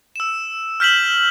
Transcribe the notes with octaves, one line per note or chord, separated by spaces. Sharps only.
E6 E7
F6 G6 B6 E7 F#7